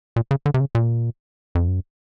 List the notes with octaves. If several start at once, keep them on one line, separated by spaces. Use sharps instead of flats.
A#2
C#3
D3
C3
C#3
A#2
F2
F#2